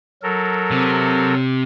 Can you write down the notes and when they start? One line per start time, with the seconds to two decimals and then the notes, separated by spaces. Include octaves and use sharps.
0.23 F#3 A4 A#4
0.71 C3